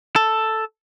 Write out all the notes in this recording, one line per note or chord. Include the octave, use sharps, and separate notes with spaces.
A4